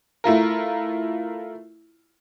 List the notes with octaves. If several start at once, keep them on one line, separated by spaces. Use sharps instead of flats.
A3 E4 F4 A#4